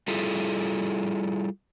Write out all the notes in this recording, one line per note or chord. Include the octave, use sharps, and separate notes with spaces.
G3 E4 F4 G#4 A4